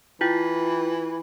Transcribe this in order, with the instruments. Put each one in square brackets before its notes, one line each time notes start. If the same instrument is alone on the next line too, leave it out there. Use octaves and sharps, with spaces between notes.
[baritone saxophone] E3 [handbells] E4 F4 G5